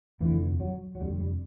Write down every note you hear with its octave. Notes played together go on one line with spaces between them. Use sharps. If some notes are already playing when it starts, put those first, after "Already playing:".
F1 F2 D3 E3
F#3
F#3
F1 F2 D3 G3
G3